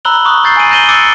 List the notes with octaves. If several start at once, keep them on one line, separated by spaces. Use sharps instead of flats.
A#5 B5 E6 F#6 F#7 G7
A#5 C#6 D#6 F#6
C#6 G6 A6 C7
G#5 A6 D7 D#7 F#7
A#5 G6 A#6 D#7 F#7 G7
D6 E6 F#6 A6 C#7 D7